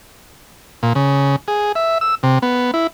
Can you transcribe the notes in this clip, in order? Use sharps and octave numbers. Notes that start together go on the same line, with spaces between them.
A#2
C#3
G#4
E5
E6
C3
B3
E4